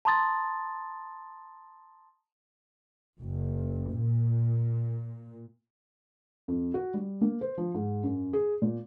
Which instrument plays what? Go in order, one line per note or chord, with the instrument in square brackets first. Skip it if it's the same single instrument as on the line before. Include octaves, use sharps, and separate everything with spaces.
[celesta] A5 A#5 C6 D#6 A6
[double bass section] F#1
A#2
[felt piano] F2
F#4
G3
A#3
C5
F3
G#2
F#2
G#4
A#2